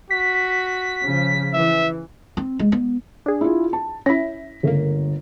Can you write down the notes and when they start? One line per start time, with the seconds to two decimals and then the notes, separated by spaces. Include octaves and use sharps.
0.11 F#4 B6
1.03 C#3 F3
1.54 E3 E5
2.37 C4
2.59 G#3
2.72 B3
3.26 D4 G#4
3.41 E4 F4
3.73 A5
4.06 C#4 E4 A#6 B6
4.63 G1 C#3 A3 A#3